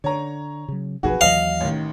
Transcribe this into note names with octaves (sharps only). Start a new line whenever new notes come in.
D3 C#5 A#5
C#3 F#3
F#1 B1 F2 F#4 G#4 B4
D#2 E3 F#3 D#5 F5 F#7
A1 D#3